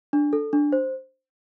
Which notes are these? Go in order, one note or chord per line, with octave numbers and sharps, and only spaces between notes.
D4
A4
D4
C5